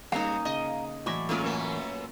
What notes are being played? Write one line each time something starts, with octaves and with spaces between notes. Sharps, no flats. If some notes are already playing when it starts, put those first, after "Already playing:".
G3 A#3 C#4 D#4 F5 A#5
C#3 D#5
A2 E3 F#3 D5 E5
G#3 A#3 C#4 F4 A#4
F#2 A3 B3